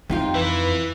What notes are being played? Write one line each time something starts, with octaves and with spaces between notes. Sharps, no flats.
F2 C3 D#4 F4 G5
E3 B4